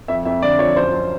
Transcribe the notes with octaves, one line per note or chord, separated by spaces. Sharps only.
F2 E5
F2 E5
D3 D5
F3 C#5
F#2 C5
F#2